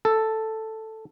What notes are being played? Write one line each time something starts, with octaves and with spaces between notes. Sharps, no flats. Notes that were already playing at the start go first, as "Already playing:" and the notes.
A4